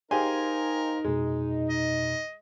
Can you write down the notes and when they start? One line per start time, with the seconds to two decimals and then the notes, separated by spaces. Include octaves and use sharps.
0.11 D#4 G4 G#4 A#4 C5 F5 G#5 C6
1.04 F2 B2 G#3
1.69 D#5